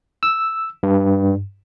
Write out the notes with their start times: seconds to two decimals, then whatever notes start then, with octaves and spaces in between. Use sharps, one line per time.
0.23 E6
0.83 G2